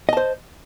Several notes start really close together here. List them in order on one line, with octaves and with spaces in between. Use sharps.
D#5 A5 C5